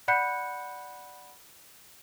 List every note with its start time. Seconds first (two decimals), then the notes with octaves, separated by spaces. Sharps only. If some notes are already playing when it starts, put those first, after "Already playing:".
0.08 D5 F#5 B5 F#6 G6 C#7